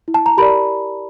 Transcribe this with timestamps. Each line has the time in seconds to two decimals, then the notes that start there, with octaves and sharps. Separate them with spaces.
0.08 E4
0.14 A5
0.26 A#5
0.37 G4 A#4 D5 B5